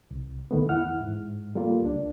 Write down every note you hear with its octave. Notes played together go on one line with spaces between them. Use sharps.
C2
C#2 D#3 A3 B3
E2 E4 F#5 F6
G#2
G3 A3 A#3 F4
C#2 D4